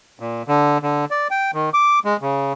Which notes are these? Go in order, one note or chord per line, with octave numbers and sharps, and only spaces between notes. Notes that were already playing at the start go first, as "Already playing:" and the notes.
A#2
D3
D3
D5
G5
D#3
D6
G#3
C#3